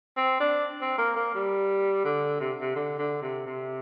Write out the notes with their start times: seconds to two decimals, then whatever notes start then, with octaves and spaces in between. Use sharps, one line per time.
0.17 C4
0.40 D4
0.81 C4
0.98 A#3
1.16 A#3
1.35 G3
2.05 D3
2.40 C3
2.61 C3
2.76 D3
2.99 D3
3.22 C3
3.46 C3